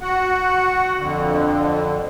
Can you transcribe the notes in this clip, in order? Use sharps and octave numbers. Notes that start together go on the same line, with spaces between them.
F#4 F#5
F2 D3